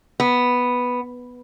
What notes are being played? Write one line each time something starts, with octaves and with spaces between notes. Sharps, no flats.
B3